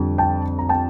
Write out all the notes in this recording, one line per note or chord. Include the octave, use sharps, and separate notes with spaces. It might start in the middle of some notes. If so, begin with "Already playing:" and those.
Already playing: F2 D3 G3
G5 A5
A#5
G5 A5